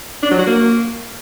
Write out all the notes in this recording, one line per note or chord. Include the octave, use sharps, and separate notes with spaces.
D4
F#3
F#4
A#3